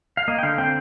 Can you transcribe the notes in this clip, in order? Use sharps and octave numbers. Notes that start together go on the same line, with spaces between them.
F5
A#3 D#5
G5
D3 F5
C4 G5